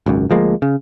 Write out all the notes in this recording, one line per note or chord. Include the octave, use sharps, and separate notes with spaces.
G#1 C#2 F#2
D2 F3 G#3 A#3
C#3